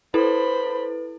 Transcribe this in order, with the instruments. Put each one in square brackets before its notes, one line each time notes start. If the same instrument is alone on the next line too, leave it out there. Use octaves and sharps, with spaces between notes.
[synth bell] E4 A4 [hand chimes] B4 [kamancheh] C5 B5